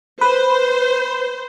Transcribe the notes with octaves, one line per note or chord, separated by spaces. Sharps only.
B4 C5